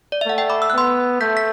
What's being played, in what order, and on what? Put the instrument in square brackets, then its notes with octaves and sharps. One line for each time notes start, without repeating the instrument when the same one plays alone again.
[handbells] D5
E5
[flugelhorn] A3 [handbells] F#5
[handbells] E5 G5
B5 D6
E6
F#6
[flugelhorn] B3 [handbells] C6 E6
[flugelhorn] A3 [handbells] G6 B6
[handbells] B6